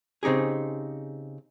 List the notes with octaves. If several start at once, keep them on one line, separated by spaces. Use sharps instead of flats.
C#3 C4 D#4 G4 G#4